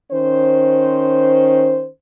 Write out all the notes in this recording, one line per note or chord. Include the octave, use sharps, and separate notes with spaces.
D#3 C#4 C5